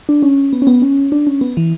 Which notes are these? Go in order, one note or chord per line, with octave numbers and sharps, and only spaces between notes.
D4
C#4
B3
C#4
B3
C#4
D4
C#4
B3
E3